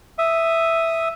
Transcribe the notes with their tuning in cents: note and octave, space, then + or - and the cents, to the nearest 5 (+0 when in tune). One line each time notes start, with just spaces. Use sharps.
E5 +0 D#6 +0